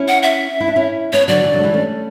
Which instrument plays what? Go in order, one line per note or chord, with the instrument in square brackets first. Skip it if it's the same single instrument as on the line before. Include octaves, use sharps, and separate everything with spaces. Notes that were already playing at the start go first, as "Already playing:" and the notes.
Already playing: [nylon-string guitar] C#4 E4
[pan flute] F#5
E5
[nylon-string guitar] E4
D4
C#4 E4
[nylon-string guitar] B3 D4 [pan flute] C#5
[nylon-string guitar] D3 F#3 [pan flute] D5
[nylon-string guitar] C#3 E3
D3 F#3
A3
E3 G3
A3 C#4